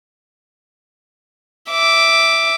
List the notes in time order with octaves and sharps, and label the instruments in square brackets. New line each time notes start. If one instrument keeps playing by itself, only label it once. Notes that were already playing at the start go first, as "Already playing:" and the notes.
[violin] E5 D6